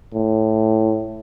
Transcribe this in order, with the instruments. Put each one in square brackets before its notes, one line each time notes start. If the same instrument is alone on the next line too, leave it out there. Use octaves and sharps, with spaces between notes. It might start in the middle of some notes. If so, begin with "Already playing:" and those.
[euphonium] A2